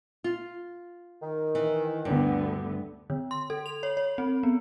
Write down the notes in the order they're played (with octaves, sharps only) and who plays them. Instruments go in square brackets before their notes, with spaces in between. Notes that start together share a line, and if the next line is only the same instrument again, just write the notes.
[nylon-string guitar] F4
[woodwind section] D#3
[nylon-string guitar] E3
[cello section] D2 D3 B3 [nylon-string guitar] G2
[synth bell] D3
C6
A4
F7
C#5
C#5
C4
B3